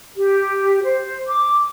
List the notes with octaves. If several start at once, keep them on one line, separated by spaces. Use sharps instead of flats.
G4
C5
D6